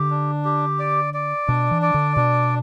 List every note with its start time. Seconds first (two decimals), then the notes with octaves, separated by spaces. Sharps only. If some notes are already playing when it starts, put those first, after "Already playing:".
Already playing: D3 G4
0.10 D4
0.45 G4
0.79 D5
1.14 D5
1.48 B2 D4
1.71 E3
1.82 D5
1.94 D3
2.16 B2 D4